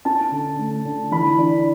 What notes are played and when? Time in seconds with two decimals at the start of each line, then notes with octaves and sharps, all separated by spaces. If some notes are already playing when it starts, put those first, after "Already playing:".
0.05 C#4 A5
0.31 D3
0.59 A3
0.85 D3
1.11 E3 B5
1.38 D4